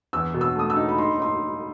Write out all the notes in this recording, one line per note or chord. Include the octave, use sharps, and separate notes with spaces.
E2 E6
B2
E6
A3 D#6
E6
D#4
B5
D#4 C6
D#4 C6